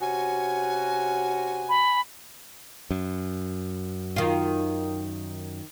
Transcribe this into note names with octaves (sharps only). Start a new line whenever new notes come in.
C3 C#4 F#4 G#5
B5
F#2
D#3 F4